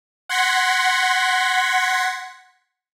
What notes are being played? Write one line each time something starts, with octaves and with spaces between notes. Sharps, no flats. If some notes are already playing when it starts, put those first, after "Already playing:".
F#5 C6 G#6 A#6 B6 C#7